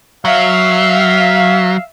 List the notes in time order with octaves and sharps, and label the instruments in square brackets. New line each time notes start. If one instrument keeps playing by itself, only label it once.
[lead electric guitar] F#3 [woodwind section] E5 F5